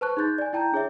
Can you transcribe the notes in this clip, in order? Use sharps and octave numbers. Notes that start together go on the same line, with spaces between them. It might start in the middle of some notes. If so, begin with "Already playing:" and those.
B4 C5 A5 C#6 F#6
D#4 G#4 C6 F#6 G6 A6
D5 G#5
E4 G5 A5 A#5 G6
D4 G#4 C#5 E5